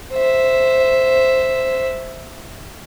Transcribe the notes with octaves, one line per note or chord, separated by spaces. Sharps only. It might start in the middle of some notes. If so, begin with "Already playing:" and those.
C5 E5